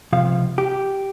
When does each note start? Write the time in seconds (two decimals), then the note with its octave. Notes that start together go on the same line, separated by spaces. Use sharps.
0.12 C#2 C3 F3 F5
0.58 G4